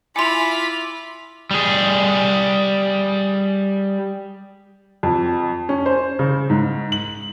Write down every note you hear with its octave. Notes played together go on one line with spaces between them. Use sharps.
E4 F4 G#5 B5 C6 D6 F6
G3 G#4
F2
C#4
C5
C#3
G#2
F#7